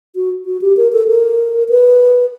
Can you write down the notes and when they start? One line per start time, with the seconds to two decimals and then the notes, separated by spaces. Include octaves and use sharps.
0.15 F#4
0.46 F#4
0.61 G4
0.77 A#4
0.92 A4
1.08 A#4
1.69 B4